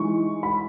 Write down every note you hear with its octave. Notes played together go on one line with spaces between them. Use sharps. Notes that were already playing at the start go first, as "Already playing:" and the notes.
Already playing: E3 G#3 D#4 C#6
B5